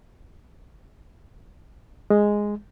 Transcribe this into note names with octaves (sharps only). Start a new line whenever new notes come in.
G#3